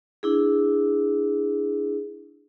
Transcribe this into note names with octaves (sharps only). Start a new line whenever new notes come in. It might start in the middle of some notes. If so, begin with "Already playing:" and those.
D4 E4 G#4